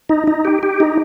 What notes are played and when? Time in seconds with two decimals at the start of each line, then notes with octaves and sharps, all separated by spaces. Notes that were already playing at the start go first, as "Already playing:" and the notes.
0.09 D#4
0.27 D#4
0.45 G4
0.63 G4
0.80 D#4